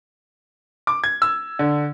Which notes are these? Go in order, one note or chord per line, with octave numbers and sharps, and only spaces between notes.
D6
G#6
E6
D3